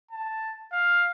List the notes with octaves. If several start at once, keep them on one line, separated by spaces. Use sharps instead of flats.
A5
F5